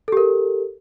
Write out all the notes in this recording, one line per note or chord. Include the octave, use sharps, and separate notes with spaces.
G4 A4 A#4